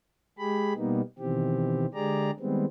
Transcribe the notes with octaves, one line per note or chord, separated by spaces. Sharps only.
G#3 G4 G#4 B5
B2 G3 A#3 B3 D#4
B2 D#3 E3 C4 G4
D3 G#3 G4 G#4 D5 A#5
D#3 G3 G#3 B3 C4